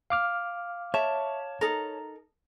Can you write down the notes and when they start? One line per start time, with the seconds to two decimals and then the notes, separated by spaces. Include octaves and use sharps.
0.10 F5 D6 F6
0.94 C#5 E5 A5
1.61 D#4 A4 A#4